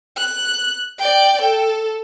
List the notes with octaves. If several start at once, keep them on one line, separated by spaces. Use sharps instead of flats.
F#6
D5 G5
A4